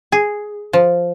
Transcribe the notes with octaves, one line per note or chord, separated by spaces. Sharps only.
G#4
F3